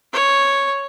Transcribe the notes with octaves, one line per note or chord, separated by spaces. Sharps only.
C#5